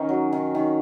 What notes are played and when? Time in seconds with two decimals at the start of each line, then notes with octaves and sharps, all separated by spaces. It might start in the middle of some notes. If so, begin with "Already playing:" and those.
Already playing: D#3 C#4 D#4
0.09 F#3
0.33 D#3
0.55 D#3